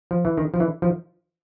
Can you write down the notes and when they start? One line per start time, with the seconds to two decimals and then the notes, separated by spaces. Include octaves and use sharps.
0.11 F3
0.25 E3
0.38 D#3
0.54 F3
0.60 E3
0.82 F3